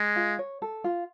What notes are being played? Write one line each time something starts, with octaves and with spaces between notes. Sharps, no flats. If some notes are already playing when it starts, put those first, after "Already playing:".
Already playing: G#3
F4
C#5
A4
F4